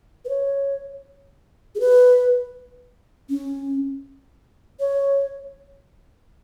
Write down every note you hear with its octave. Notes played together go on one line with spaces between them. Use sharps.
B4
C#5
G#4
B4
C#4
C#5